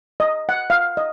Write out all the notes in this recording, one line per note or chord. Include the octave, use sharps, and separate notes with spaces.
D#5
F#5
F5
D#5